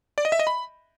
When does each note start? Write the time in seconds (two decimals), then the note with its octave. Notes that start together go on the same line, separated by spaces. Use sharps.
0.18 D5
0.25 D#5
0.32 E5
0.39 D#5
0.47 B5